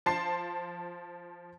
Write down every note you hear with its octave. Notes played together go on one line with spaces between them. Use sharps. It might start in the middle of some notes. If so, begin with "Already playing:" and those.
F3 A5 C6 C7